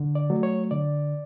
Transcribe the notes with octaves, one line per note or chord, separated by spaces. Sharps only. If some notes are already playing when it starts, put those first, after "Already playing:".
Already playing: D3
D5
F#3 A3
C#5
D3 D5